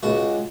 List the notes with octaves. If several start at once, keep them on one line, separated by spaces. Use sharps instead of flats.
C#2 F#4